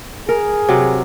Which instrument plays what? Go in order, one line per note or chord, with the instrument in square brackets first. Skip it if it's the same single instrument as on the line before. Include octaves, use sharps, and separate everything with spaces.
[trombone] G#4 [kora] A#4
[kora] C3 F#3